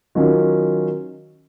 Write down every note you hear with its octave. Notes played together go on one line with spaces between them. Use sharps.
D#3 F#3 C#4 F4